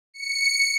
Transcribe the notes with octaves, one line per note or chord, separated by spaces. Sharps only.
C#7